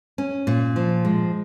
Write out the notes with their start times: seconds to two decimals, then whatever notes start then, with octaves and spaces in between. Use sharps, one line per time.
0.18 C#4
0.47 A#2
0.76 F3
1.05 G#3